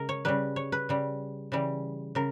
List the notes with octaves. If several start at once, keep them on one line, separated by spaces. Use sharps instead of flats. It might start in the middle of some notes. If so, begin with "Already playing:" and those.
Already playing: C#3 G#3 A#4
C#5
C#3 G3 B4
C#5
B4
C#3 G3
C#3 E3 G3
C#3 A#4